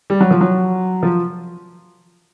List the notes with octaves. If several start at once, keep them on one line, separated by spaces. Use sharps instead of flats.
G3
F#3
F3
F#3
F3